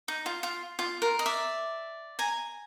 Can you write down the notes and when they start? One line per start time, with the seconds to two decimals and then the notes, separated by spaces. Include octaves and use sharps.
0.08 D#4
0.26 F4
0.43 F4
0.79 F4
1.02 A#4
1.19 D#5
1.26 D5 E5
2.19 G#5 A#5